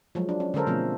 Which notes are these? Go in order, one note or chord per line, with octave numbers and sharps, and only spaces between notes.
F3 F#3 G#3
D4
C#4
D3 G#3 C#4 A4 A#4 C5
B2 F3 A3 C4